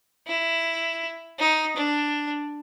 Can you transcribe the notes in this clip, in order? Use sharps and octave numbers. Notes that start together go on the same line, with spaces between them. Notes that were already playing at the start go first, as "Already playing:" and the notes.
E4
D#4
D4